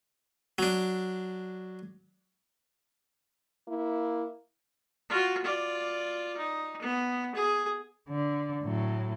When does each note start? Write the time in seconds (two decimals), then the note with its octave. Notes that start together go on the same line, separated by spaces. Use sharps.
0.58 F#3 D4
3.68 A#3 E4
5.09 F4 F#4
5.44 F4 D5
6.37 D#4
6.81 B3
7.35 G#4
8.09 D3
8.63 A2 F#3